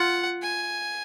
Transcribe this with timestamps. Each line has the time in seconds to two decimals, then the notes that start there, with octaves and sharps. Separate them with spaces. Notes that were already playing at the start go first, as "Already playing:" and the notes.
Already playing: F4 F#5
0.42 G#5